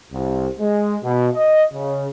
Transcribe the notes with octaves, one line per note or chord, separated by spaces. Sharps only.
C2
G#3
B2
D#5
C#3